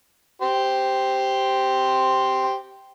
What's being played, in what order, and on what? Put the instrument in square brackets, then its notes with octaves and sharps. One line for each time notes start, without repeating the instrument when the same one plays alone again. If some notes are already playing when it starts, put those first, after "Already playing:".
[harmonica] G4 C5 C6